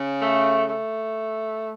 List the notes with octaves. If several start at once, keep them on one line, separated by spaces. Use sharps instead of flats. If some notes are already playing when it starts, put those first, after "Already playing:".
Already playing: C#3
A3
A3